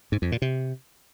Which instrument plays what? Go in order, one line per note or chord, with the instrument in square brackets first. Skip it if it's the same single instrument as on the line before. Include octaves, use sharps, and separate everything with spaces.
[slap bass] G#2
F2
A#2
C3